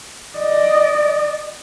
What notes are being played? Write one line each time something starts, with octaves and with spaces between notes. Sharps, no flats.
D5 D#5